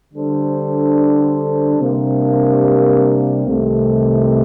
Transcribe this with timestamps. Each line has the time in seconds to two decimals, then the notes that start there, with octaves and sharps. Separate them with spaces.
0.14 D3 G3 D4 A4 C5
1.79 C3 G3 A#3 D4
3.45 C2 C3 D#3 A3